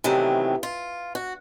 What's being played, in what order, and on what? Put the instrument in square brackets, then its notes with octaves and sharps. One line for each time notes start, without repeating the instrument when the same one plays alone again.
[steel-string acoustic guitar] C3 D#3 E3 F#3 A3 B3
F4
F#4